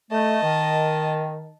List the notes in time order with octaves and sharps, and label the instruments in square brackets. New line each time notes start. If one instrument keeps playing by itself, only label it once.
[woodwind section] A3 [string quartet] D#5 A5
[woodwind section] D#3